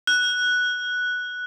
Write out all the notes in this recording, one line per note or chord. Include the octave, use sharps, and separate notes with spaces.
F#6